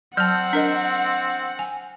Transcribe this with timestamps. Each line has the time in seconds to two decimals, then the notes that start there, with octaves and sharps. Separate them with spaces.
0.17 F#3 C4 F#5 A5 F6 G6
0.53 D4 A#4 D#5
1.59 G#5